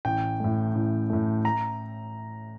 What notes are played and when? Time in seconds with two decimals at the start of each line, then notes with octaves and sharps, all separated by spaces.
0.05 A1 G5
0.40 A2 A3
0.75 A1
1.10 A2 A3
1.45 A#5